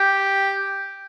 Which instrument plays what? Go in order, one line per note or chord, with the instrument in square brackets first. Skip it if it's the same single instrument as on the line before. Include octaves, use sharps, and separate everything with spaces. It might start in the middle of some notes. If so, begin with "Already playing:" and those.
Already playing: [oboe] G4